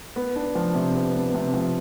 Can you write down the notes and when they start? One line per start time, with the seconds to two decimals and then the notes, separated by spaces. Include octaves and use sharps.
0.16 B3
0.36 D4
0.55 F3
0.75 C3
0.94 B3
1.15 B3
1.34 C3
1.54 F3